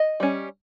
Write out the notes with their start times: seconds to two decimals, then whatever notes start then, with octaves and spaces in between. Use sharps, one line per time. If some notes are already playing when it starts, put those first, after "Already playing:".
Already playing: D#5
0.20 G3 C#4